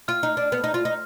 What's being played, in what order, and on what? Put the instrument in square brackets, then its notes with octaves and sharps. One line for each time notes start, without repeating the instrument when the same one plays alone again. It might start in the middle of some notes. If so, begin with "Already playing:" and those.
[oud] F4 [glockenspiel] F6
[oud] D#4
D4
B3
D#4
F4
D#4